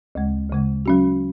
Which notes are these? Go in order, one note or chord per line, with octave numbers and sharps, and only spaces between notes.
D2 C#3 G#3
D2 C#3 G#3
F#3 C#4 F#4